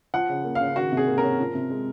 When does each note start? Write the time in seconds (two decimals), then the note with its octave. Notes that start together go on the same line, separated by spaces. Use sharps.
0.14 F3 F#5
0.29 C#3
0.45 A#3
0.55 C#3 F5
0.76 D#3 F#4
0.92 C3
0.97 G#4
1.08 A#3
1.18 A#4
1.23 C#4
1.39 F3
1.55 C3
1.70 G#3